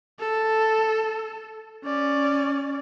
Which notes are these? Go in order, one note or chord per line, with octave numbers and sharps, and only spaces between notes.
A4
C#4 D5